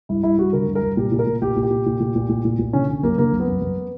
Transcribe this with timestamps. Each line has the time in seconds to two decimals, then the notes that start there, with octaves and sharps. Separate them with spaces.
0.09 G2 E4
0.23 G2 E4
0.38 G2 F#4
0.53 D3 A#4
0.68 G2
0.75 A#4
0.82 G2
0.97 A#2 G4
1.12 A#2
1.19 A#4
1.27 A#2
1.42 A#2 G4
1.56 A#2
1.63 G4
1.70 A#2
1.86 A#2
2.00 A#2
2.16 A#2
2.29 A#2
2.45 A#2
2.59 A#2
2.73 D3 C#4
2.89 D3
3.03 F#2 A#3
3.18 D3 A#3
3.33 F#2
3.40 B3
3.47 F#2
3.62 F#2